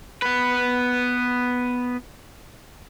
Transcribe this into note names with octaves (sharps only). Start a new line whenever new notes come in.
B3 B4